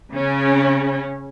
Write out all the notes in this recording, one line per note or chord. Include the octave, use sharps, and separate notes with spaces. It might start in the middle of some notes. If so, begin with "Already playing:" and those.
C#3 C#4